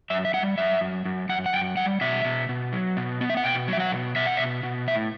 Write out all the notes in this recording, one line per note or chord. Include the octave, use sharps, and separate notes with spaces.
F#2 E5
E5
G3 F#5
F#2 E5
F#2
F#2
F#2 F#5
F#5
F#2 G5
G3 F#5
B2 E5
B2
B2
F#3
B2
B3
E5
F#5
B2 G5
F#3 E5
F#5
B2
B2 E5
F#5
B2 E5
B2
A2 E5